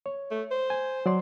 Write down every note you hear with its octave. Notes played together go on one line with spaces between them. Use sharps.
C#5
A3
C5
G#5
F#3 D5 C6